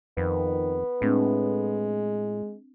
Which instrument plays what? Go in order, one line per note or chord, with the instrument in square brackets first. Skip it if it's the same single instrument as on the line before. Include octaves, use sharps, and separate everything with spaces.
[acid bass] F2 [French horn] D#3 [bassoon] B3
[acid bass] A2 [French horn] G#3 [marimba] C4 D4